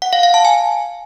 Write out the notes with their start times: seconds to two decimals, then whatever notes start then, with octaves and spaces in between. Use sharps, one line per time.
0.02 F#5
0.13 F5
0.23 F5
0.34 A5
0.45 G#5